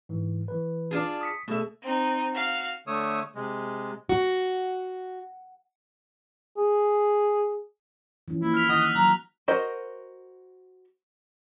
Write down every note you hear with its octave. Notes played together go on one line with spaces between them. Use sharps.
G#2 E3
E3 B4
D4 F4 G#4
D#6 B6 C#7
B2 A3 G#4 A4 E5
C4 D#4
F#4 F5
D3 A3 C#5 D#6 E6
C3 G#3
F#4
G#4
E3 F3 C#4
A#3 E4
F6 B6 F7
D#3 D#5 F#5
E6 F#6
F#3 A#5
F#4 A#4 C5 D#5